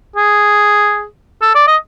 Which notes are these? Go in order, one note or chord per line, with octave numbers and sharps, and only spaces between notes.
G#4
A4
D5
D#5